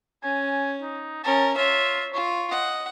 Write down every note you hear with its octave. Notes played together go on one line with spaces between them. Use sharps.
C#4 G#5
D#4
C#4 A#4 A5
F4 C#5 E5
F4 C#6
D#5 F#5